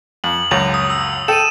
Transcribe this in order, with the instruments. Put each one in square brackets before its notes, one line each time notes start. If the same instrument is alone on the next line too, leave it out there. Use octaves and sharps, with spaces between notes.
[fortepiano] F2 [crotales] F#7
[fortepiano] C#2 F#2 [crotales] F7
[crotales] D#6
E6
[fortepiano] A4 G5 [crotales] D#7 E7